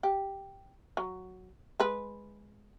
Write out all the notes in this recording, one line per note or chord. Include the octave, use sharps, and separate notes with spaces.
G4
F#3
G#3 B4